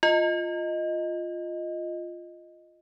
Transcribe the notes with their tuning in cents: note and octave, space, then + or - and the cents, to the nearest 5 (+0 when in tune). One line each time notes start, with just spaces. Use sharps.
F4 +0 D#5 +0